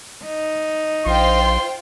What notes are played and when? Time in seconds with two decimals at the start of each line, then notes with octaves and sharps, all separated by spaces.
0.25 D#4
1.06 A#1 F4 C5 G5 C6